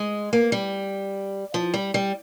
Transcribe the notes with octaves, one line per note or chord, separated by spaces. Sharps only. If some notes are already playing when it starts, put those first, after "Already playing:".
Already playing: G#3
A#3
G3
F3
G3
G3